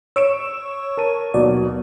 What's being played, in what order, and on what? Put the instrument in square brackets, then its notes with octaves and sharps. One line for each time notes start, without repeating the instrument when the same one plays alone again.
[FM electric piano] C#5 C#6 [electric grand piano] E6 D7 E7
[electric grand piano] A#4 A5 D#7
[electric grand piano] D#2 B2 F#3 [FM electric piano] D5